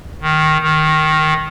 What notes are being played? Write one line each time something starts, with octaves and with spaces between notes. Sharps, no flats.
D#3
D#3